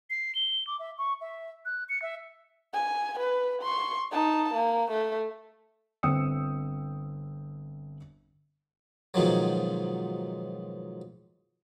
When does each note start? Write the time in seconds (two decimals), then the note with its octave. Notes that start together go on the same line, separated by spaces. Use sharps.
0.10 C7
0.35 G7
0.67 D6
0.79 E5
0.98 C#6
1.21 E5
1.65 F#6
1.89 C#7
2.02 E5
2.73 G#5
3.19 B4
3.62 C6 C#6
4.12 D#4 A5
4.54 A#3
4.91 A3
6.03 G1 C4 G5 D#6 E6 C#7
9.14 G#2 B2 D#3 F3 F#3